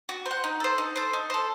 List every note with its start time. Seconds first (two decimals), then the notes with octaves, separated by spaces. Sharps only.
0.09 F#4
0.26 C5
0.31 F#5
0.44 D#4
0.60 A4 C5
0.78 D#4
0.96 A4 C5
1.13 D#4
1.30 A4 C5